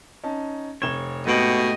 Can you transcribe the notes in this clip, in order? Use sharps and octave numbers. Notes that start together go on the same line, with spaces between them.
C#4 D#4 A5
F1 C#5 E7 G7
G#1 B2 A3 F#4 G4 D#5 F#7